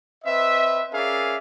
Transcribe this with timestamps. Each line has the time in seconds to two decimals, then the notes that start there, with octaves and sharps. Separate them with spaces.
0.24 C4 B4 D#5 E5
0.92 C#4 G#4 A#4 D5 E5 F5